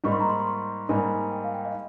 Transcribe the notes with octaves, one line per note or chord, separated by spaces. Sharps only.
G#2 G3 A#3 D#4 C#6
C6
A#5
C6
C#6
C6
G#2 G3 A#3 D#4 G#5
A#5
G#5
G5
F5
G5
D#5